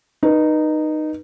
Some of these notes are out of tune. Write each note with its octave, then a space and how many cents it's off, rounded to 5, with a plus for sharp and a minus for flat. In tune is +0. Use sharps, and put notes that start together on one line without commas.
D#4 -15 B4 -30